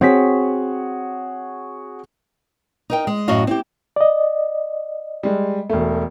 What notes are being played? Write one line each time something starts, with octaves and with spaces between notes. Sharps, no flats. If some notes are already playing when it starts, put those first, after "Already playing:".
C4 F#4 G#4 C#5 B6
D#4 A#4 G5
G#3
F#2 A2 F#4 D#5 F5
C4 E4 G4
D5 D#5
G3 G#3
E1 A3